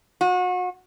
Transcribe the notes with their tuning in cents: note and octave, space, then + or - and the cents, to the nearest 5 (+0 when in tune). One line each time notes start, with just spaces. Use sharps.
F#4 -35